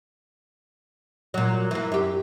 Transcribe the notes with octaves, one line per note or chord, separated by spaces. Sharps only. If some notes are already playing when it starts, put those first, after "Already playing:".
A#2 F#3
E3 A#3
F#2 G4